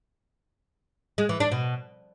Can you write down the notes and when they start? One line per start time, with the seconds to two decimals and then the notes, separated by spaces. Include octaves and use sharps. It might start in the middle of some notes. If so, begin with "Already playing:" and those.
1.18 G#3
1.29 E3
1.40 D4
1.52 B2